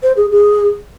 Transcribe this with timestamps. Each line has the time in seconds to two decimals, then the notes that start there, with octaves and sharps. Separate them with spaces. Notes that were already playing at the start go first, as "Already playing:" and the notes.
0.03 C5
0.17 G#4
0.31 G#4